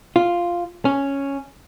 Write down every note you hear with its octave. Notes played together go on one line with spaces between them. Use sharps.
F4
C#4